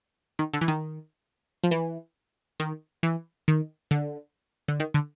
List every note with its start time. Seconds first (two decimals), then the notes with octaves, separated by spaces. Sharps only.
0.39 D#3
0.53 D3
0.61 E3
0.68 D#3
1.64 F3
1.71 E3
2.60 D#3
3.03 E3
3.48 D#3
3.91 D3
4.68 D3
4.80 D#3
4.94 D3